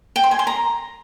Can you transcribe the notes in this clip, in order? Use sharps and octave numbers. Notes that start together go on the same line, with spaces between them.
G5
C6
G#5
C6
A#5